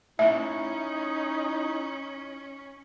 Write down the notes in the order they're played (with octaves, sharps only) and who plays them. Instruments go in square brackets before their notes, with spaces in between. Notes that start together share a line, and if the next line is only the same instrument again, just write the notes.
[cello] C#4 [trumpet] D#4 [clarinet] E4 [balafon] E5